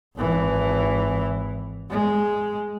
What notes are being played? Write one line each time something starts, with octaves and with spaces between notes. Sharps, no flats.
G#1 E3
G#3